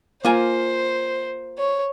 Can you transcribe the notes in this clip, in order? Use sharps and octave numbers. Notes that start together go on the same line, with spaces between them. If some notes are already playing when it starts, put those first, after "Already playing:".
A#3 F4 C5 G#5
C#5